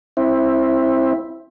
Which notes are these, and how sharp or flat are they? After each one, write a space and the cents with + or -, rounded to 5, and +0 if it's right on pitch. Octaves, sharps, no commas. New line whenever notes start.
C4 +20 E4 +0